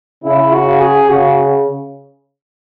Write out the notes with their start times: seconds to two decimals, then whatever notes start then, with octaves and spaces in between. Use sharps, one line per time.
0.24 C#3 E4
0.52 F#4
0.80 G#4
1.09 C#3 F#4